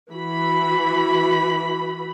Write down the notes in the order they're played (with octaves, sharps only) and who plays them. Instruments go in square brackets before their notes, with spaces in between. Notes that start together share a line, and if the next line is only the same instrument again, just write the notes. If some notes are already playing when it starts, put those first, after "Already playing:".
[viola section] E3 F#4 B5